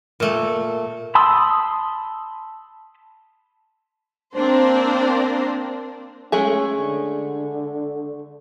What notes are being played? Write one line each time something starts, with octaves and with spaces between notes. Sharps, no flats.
A#2 A3
A5 B5 C6 D#6 E6
A#3 C4 D4 A#4 C5
G#3 A3 C#4 G#4
D3